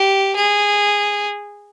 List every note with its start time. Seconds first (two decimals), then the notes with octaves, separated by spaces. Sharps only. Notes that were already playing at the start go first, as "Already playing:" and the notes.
Already playing: G4
0.36 G#4